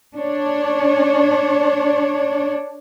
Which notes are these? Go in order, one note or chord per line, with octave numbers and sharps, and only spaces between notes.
D4 C#5